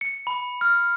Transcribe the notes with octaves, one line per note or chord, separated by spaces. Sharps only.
C#7
B5
F6